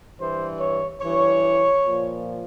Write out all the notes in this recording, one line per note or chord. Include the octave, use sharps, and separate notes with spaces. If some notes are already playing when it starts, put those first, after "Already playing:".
G2 E3 C5
C#5
G2 E3 C#5
A#2 F3